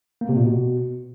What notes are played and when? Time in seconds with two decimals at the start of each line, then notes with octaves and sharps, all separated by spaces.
0.21 A#3
0.29 C3
0.37 A#2
0.44 B2